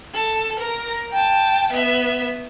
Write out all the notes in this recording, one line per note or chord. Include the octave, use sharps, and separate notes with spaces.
A4
A#4 A#6
G5 A5
B3 E5